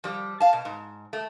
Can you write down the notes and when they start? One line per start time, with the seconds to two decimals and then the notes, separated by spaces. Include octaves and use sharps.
0.04 F3 G3
0.40 F5 A5
0.53 B2
0.65 G#2
1.13 A3